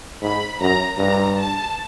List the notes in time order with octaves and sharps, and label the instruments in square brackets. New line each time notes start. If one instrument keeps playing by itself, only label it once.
[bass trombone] G#2 [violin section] B5
[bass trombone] F#2 [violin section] A#5
[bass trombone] G2 [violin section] A#5
[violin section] A5